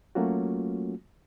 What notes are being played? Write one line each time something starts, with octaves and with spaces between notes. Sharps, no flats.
F#3 A3 A#3 C#4 F4 F#4